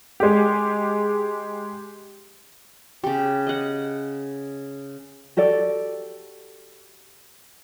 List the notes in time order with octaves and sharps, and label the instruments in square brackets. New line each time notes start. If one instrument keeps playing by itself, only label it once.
[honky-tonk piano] G#3 G4
[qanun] C#3 G4
D#5 F#5
[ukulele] F#4 G4 A4 D5